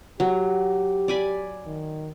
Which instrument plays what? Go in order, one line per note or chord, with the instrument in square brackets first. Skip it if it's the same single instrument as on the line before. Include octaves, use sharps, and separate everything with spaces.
[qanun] F#3 [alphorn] G4
[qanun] D5 G#5 B5
[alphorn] D#3